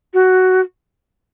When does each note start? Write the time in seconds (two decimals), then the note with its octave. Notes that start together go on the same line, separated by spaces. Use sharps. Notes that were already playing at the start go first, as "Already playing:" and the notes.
0.13 F#4